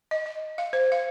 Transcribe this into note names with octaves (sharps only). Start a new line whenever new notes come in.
D#5
D#5
F5
C5
F5